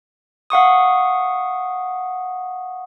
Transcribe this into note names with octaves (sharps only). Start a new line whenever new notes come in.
F5 F#5 C#6 D#6